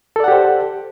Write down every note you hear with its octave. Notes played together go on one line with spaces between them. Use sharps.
G4 A4 C5 D5 F#5